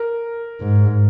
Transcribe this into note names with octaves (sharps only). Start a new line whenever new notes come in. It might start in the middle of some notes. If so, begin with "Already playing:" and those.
Already playing: A#4
G#2